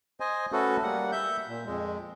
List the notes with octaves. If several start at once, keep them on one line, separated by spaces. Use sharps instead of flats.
C5 D#5 G#5
A3 C#4 F#4 A4 B4
G3 A#3 F#5
E5 G6
A#2
F2 G#3